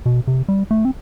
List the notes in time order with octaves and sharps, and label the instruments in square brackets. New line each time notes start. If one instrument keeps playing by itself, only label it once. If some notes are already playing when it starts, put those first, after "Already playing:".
[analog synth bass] B2
C3
G3
A3
C4